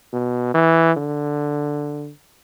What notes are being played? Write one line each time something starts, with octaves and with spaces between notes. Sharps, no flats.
B2
E3
D3